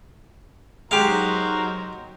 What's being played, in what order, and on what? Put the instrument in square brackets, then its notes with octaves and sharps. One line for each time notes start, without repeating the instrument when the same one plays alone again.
[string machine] F#3 D#4 [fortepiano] G#3 [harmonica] F#4 A#4 C5 [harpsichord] G4 F5